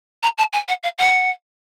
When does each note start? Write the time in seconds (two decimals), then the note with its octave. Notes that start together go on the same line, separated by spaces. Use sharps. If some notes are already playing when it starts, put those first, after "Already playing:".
0.23 A#5
0.38 A5
0.53 G#5
0.68 F#5
0.83 F5
0.98 F#5